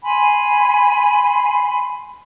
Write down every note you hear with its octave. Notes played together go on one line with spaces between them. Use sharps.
G#5 B5 C6